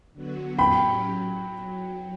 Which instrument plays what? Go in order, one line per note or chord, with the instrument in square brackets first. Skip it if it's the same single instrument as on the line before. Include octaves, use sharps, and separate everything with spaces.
[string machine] D3 F#3 B3 F#4
[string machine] A2 F#3 C#4 G4 [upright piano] G5 B5
[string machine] F#3